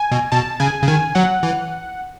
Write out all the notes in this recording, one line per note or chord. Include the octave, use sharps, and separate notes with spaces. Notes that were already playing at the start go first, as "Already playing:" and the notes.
Already playing: G#5
B2
B2 A5
C#3 G#5
C#3
D#3 G#5
F#3 F#5
E3